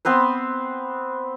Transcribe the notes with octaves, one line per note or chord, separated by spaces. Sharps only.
B3 C4 B4 C5